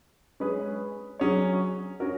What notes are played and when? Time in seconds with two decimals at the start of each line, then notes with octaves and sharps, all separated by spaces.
0.40 G#3 C#4 G#4 B4
1.20 F#3 C#4 G#4 C#5
2.00 C#4 F#4 A#4